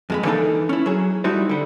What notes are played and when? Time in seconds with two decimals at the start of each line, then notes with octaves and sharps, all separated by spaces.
0.10 F2 G#3 B5
0.25 E3 A#3 D4 D#4 G#4 A4
0.69 C#4 E4
0.86 F#3 G#4
1.24 G3 A3 D#4 E4 F#4 C5
1.49 D3 G3